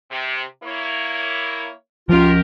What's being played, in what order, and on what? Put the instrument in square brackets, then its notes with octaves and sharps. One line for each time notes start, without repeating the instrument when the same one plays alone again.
[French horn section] C3
A#3 E4 C#5
[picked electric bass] F3 C#4 [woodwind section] F4 [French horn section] G4 A#4